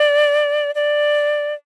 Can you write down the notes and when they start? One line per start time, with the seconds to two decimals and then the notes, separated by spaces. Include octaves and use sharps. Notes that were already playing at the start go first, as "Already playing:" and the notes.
Already playing: D5
0.75 D5